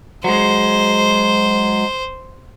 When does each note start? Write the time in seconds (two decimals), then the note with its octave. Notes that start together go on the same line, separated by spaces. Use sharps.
0.24 F#3 G#3 C5